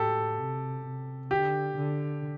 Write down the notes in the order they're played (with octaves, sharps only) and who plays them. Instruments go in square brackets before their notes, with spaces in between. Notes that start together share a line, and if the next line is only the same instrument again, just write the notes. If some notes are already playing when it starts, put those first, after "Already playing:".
Already playing: [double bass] A2 [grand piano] G4 A4
[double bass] C3
C3
[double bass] D3 [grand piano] G4
[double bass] D3